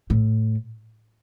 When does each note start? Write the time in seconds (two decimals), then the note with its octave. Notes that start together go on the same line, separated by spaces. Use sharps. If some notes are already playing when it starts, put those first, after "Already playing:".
0.10 A2